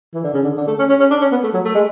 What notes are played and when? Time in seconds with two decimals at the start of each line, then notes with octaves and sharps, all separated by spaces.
0.14 E3
0.24 D3
0.34 C#3
0.43 D3
0.57 D3
0.67 A3
0.79 C#4
0.89 C#4
1.00 C#4
1.11 D4
1.22 C#4
1.32 B3
1.44 A3
1.54 F#3
1.65 A3
1.75 G#3